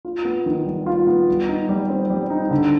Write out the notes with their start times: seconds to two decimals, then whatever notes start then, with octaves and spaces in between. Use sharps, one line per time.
0.05 F4
0.25 B3
0.46 D#3
0.66 G3
0.86 F4
1.07 B3
1.28 G3
1.48 D#4
1.69 G3
1.90 C4
2.10 G3
2.30 D#4
2.50 D3